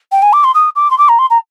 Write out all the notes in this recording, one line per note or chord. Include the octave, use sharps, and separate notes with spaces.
G5
G#5
D6
C6
D#6
D6
C6
D6
A#5
C6
A#5